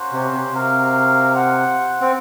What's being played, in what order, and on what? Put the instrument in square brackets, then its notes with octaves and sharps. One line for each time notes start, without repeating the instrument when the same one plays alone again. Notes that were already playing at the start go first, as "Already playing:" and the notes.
Already playing: [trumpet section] A#3 C#4 F#4 C5
[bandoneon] C3
C3
[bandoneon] C3 [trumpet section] F#4 A#4 F5
[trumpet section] F4 C5 F#5
[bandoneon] C4